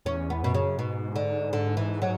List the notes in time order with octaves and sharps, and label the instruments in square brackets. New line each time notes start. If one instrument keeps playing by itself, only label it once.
[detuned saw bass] E2 [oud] C#4
[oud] B3
[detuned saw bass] F#2 [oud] B2
[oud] C#3
[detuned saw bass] G#2 [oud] B2
[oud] D3
D3
E3
F#3